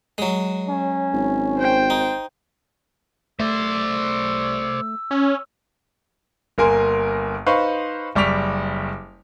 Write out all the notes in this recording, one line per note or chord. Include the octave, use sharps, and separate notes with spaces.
F#3 G#3
C#4
G#1
C5 G5
D#4
A3 C5 D5 E6
C#4
G1 A#3 A#4 G#5 C6
D#4 B4 C5 F5 C#6
F#1 G3 C#6 D6 B6 F7